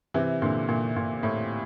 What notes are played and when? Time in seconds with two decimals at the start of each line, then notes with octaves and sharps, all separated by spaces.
0.14 C3 E3
0.42 A#2 D3
0.69 A#2
0.96 A#2
1.23 A2